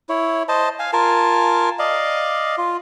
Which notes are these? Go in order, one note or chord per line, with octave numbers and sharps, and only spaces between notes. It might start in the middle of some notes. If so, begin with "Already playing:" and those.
E4 C#5
C5 D#5 A5
F5 G#5
F4 A#4 G#5 A5
D5 D#5 F5
F4